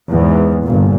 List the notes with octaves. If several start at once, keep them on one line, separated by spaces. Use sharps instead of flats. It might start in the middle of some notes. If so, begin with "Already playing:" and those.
E2 G#2
G1 A#2